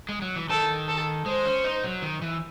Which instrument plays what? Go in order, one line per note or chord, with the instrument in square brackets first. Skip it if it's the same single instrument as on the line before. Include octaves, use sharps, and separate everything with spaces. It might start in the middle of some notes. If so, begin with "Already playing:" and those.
[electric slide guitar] G#3
F#3
E3
[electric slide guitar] D#3 [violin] A4
[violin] A4
[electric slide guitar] G#3 [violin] C5
[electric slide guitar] C#4
D#4
F#3
D#3
E3